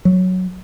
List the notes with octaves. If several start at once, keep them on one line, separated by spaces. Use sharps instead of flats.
F#3